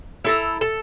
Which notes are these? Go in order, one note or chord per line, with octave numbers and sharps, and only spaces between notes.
E4 A4 A#5
A4